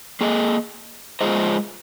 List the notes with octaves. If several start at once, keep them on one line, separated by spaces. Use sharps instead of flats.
A#3 G#4 D#5
G#3 F4 G#4 C5 D#5